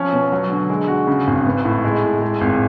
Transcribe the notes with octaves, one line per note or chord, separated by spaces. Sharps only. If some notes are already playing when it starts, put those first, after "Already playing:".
Already playing: F3 C#4
B2
F#3
D3
G#3
F#4
C#3
G#1
B3
A2
G#3
A2
G#3
G#1